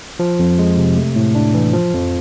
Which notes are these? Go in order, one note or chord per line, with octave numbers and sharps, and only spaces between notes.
F3
F2
G#3
C3
A3
A2
D4
E3
F3
F2